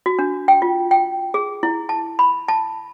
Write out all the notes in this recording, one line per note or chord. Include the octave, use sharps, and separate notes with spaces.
F#4
D4
G5
F4
G5
G#4
E4
A5
B5
A5